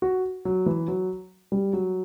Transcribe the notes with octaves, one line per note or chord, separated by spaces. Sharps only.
F#4
F#3
E3
F#3
G3
F#3